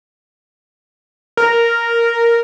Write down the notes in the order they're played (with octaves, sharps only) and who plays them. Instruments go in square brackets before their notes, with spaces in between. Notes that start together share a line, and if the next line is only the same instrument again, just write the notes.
[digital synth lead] A#4